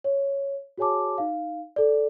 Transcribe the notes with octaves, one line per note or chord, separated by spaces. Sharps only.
C#5
F#4 G#4 C#5 G#5 A5 D6
D#4 F5
A4 D5